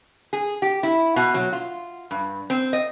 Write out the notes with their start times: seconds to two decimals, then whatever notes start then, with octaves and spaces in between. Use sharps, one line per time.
0.33 G#4
0.62 G4
0.83 E4
1.16 B2
1.34 F#3
1.52 F4
2.11 G2
2.50 C4
2.73 D#5